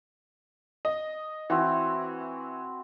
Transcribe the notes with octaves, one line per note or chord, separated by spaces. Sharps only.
D#5
E3 C4 E4 F#4